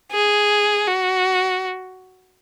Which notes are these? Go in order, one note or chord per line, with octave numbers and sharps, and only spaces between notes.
G#4
F#4